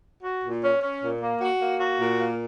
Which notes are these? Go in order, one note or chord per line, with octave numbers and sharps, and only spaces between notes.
F#4
A#2
C#4
C#4
A#2
A#3
F#4
A#3
F#4
A#2
A#3